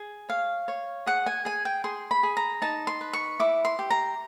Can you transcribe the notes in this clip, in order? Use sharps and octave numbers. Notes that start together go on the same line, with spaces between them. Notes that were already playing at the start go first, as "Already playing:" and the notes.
Already playing: G#4
C#5 F5
C#5
G#4 F#5
G#5
G#4 G#5
G5
G#4 C6
B5
G#4
A#5
D#4 A5
C6
B4
C#6
E4 D6
C6
G4
A#5